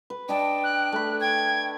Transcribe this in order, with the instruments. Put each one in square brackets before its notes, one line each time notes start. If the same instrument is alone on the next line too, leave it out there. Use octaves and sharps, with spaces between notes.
[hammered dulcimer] B4
[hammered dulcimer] D4 D#5 A5 [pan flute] G5
[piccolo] F#6
[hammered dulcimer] A3 B5
[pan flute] G5 [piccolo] G#6